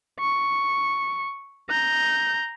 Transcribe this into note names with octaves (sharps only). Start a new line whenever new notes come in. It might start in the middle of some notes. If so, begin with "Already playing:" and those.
C#6
A#5 G6